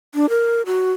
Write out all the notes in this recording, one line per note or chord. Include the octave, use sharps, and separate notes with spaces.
D4
A#4
F#4